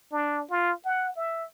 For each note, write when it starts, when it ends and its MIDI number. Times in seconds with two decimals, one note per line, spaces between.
0.12 0.43 62
0.50 0.72 65
0.85 1.13 78
1.16 1.45 76